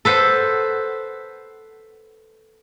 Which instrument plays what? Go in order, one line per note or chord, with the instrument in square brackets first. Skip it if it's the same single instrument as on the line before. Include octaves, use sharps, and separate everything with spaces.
[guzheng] A4 B4 C5 F#5